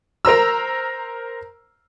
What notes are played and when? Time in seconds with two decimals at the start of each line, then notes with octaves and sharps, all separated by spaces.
0.25 A#4 C5 A#5 E6